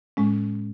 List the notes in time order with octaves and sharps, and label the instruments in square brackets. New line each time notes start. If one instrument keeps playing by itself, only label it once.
[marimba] A2 G#3 C#4